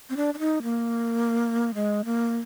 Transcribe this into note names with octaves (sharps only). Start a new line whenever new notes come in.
C4
D4
D4
D#4
A#3
G#3
A#3